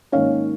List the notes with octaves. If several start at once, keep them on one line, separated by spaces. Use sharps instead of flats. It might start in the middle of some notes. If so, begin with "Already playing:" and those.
G#2 D#3 A#3 C#4 C#5 F5